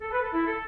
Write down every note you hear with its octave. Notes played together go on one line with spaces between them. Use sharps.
A4
B4
A4
E4
A4